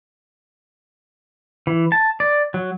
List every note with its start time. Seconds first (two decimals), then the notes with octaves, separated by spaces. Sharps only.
1.67 E3
1.92 A5
2.20 D5
2.54 F#3